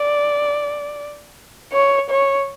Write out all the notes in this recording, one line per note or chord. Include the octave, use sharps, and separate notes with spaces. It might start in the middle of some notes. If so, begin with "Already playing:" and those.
Already playing: D5
C#5
C#5